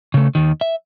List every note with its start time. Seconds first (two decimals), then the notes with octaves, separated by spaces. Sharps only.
0.14 C#3 A3
0.35 D#2 D#3
0.61 E5